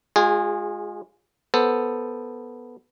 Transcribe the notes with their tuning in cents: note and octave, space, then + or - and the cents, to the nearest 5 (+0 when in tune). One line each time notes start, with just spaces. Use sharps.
G#3 +5 F4 +30 G#4 -20
B3 -5 A4 +0 C5 +0